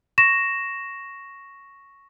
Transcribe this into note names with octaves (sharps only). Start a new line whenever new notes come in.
C#6 A#6 E7